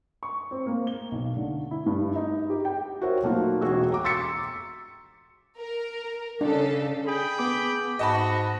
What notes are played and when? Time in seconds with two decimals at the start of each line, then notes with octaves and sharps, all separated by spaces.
0.23 C#6
0.51 C4
0.67 A#3
0.87 G7
1.12 B1
1.37 D3
1.71 E4
1.86 G2
2.16 D#4
2.50 G4
2.65 G5
3.01 F#4 A#4 C5 C#5 E5
3.23 F#3 A3 A#3 D#4 F4
3.61 E1 F#4 G#4 E6
3.90 G5 A#5 D6
4.04 C6 E6 A6 B6 C#7
5.57 A#4
6.41 C#3 D4 A4
7.07 G#4 G5 B5
7.39 B3 D6
7.99 G#2 F#4 D#5 A5 B5